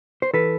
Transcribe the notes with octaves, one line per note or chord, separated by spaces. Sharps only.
C5
E3 A4 B4